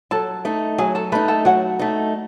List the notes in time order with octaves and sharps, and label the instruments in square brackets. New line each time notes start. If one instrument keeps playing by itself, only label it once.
[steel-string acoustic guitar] F#3 [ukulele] A4 A5
[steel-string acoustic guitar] A3 D#4
[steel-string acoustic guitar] F#3 [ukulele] G#4 G#5
[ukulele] A4 A5
[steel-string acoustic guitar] A3 D#4 [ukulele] B4 B5
[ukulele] A4 A5
[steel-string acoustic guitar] F#3 [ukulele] F#4 F#5
[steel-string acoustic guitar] A3 D#4